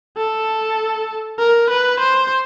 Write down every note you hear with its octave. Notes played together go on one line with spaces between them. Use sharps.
A4
A#4
B4
C5